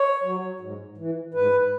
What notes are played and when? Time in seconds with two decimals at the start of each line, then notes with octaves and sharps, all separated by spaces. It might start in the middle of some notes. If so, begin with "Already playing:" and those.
Already playing: C#5
0.24 F#3
0.60 G#2
0.98 E3
1.34 G#2 B4